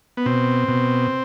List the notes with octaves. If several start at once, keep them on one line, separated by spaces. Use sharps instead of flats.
B3
B2 C4
B2